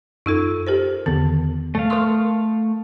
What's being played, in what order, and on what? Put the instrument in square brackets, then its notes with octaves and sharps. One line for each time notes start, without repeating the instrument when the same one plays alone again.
[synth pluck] F#2 [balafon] D#4 F4 A4
[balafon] G4 A#4 C5
[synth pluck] E2 D3 D#3 [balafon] B3
[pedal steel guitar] A3 F5
[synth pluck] A#4 D#6 [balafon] C6 C#6